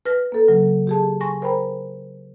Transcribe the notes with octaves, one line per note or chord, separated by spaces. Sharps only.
B4 F6 A#6
A#3 A4
C#3 F#3
G4 G#4 A5
G#5 C6 C#6 A#6
A#4 C5 G5 A#5 B5